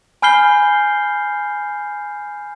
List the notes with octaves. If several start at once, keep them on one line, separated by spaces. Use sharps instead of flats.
G#5 B5 F6 G6 C7 G7